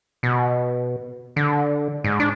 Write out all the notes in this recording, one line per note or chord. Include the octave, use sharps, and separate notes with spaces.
B2
D3
G#2
D4